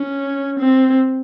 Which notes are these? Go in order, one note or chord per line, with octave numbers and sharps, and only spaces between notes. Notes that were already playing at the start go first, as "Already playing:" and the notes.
Already playing: C#4
C4